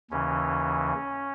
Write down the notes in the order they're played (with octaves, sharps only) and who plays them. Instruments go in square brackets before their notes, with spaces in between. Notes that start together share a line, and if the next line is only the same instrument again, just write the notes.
[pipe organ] D#2 C#3 E3 C#4